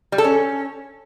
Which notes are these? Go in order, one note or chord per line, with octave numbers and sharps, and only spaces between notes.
G3
A4
C#4